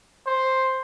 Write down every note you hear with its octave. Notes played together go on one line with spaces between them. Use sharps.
C5